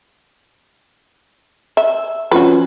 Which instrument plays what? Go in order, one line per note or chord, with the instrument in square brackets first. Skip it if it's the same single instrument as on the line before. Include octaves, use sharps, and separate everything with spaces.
[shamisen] E5
[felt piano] F3 C#4 [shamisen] F#4 B4